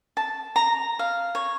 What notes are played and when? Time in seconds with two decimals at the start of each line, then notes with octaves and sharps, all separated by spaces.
0.17 A5
0.56 A#5
0.99 F5
1.35 C#5